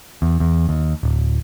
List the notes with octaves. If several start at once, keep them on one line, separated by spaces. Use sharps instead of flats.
E2
E2
D#2
D1